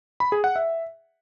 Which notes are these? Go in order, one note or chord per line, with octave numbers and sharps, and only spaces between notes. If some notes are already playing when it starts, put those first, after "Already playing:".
B5
G#4
F#5
E5